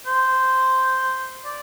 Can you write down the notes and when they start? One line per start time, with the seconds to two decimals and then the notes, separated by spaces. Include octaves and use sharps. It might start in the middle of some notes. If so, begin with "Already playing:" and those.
0.06 C5
1.45 D5